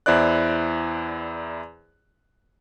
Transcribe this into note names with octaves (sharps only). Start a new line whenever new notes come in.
E2 E4 C5 D5 F#6